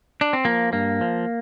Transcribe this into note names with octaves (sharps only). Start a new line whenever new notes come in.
D4
C4
F3 A#3
G2 A#3
F3